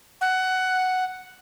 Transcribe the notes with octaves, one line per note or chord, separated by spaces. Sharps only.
F#5